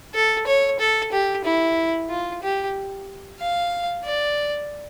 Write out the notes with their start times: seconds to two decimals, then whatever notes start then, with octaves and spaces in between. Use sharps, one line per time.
0.14 A4
0.47 C#5
0.80 A4
1.12 G4
1.44 E4
2.09 F4
2.43 G4
3.40 F5
4.05 D5